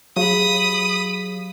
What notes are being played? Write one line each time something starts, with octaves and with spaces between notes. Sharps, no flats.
F#3 G4 G#4 F5 B5 D#6